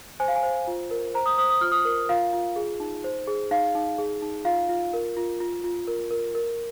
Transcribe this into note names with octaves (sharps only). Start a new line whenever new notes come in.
C5 G#5
F5
G#5
C5
F4
A#4
C5 A#5
D#6
C5 D#6
D#6
F4 F6
D#6
A#4
F4 F5
F4
G#4
D#4
C5
G#4
D#4 F5
D#4
G#4
D#4
F4 F5
F4
A#4
F4
F4
F4
A#4
A#4
A#4